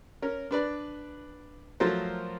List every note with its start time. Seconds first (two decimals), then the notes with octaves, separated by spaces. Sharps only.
0.22 C#4 A#4
0.51 D4 B4 D5
1.80 F3 F#3 A3 A#4 C5